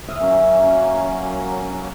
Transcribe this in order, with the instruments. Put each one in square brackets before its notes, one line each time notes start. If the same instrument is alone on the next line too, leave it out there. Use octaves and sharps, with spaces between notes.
[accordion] D2 D#6 F6 [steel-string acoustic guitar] E5
[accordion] F#3 A#3 C#4